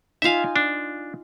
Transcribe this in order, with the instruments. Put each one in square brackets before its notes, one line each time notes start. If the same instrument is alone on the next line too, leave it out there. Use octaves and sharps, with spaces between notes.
[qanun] D#4 F4 G#5 [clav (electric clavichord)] E5 F5
[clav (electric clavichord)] D4